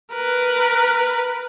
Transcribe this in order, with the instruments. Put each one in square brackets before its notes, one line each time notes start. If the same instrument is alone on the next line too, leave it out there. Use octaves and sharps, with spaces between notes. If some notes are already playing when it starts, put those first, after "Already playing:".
[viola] A#4 B4